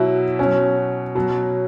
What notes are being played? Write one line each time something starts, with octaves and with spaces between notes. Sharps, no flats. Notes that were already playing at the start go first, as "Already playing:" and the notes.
Already playing: B2 F#3 E4
B2 F#3 C#4
B2 F#3